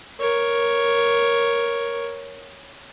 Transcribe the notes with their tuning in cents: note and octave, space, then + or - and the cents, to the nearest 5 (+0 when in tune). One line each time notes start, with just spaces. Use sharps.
A#4 +10 C#5 +0